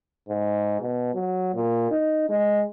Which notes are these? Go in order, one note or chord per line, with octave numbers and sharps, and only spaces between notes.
G#2
B2
F#3
A#2
D#4
G#3